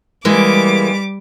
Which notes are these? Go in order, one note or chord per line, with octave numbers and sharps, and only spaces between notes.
E3 G3 G#3 A#3 D6